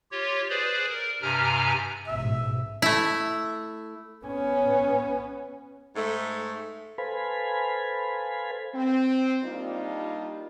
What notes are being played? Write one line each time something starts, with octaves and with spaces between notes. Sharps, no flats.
F4 G4 C#5
G#4 B4 C5 D5
A#4
G2 C3 G4 G#5 A#5 F6
A1 G#2 B2 E5
A3 E4
B3 C#4
G#2 A3
A4 B4 C5 F5 G#5 B5
C4
G3 A#3 D4 D#4 F4 G4